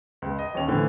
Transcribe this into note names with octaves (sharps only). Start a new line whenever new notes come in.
C#2
D#5
D#1 D#2 C#4 F7
A2 D3 E3 F3